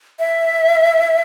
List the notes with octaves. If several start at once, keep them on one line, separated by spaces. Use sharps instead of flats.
E5